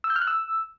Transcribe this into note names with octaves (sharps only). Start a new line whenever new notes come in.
E6
G6
F6
F#6
E6